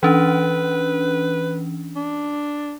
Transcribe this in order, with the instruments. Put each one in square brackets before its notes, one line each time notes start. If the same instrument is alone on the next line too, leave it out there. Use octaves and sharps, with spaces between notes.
[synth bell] E3 C#4 D4 [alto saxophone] B4
[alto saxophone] D4